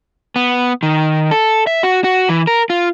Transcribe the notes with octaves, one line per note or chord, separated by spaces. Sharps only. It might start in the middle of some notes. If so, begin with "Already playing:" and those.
B3
D#3
A4
E5
F#4
F#4
E3
A#4
F4